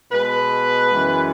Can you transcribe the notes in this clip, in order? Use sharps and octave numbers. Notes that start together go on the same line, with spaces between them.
B2 G#3 B4
F#2 E3 G#3